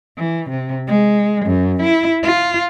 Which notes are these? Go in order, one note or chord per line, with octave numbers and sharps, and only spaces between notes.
E3
C3
G#3
F#2
E4
F4